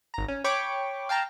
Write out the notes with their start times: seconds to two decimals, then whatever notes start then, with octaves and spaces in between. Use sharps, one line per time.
0.14 G#1 A#5
0.28 C#4
0.44 C#5 G5 B5 C#6 D6
1.09 F5 G5 A5 A#5